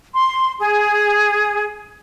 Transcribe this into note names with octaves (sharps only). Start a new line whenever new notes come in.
C6
G#4